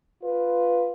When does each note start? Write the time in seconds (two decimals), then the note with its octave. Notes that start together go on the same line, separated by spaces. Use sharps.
0.23 F4 B4